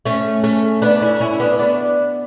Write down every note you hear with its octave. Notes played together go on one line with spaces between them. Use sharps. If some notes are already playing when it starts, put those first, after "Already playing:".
A3 C#4
A3 C#4
B3 D4
C#4 E4
C#4 E4
B3 D4
B3 D4